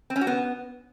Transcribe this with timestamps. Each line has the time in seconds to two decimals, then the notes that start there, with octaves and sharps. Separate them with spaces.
0.10 C4
0.16 C#4
0.21 F#4
0.27 B3